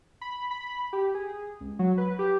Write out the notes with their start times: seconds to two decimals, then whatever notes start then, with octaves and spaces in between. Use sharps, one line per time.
0.21 B5
0.51 B5
0.93 G4
1.15 G#4
1.60 C#2
1.79 F#3
1.98 B4
2.19 G4